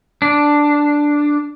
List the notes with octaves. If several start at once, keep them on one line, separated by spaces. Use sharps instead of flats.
D4